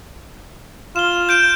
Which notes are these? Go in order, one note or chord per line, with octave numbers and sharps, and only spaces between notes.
F4 E7 G7
G6 D7 E7